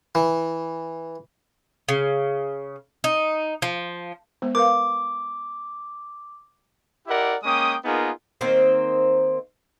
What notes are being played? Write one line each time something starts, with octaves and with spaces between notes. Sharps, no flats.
E3
C#3
D#4
F3
G#3 B3 C5
A#4 B4 F5 D6
E4 G4 A#4 D5 D#5 F#5
G#3 A#3 C#4 G5 D#6
A#3 B3 D#4 F4 G#4 A#4
D#3 A#3 C4 C5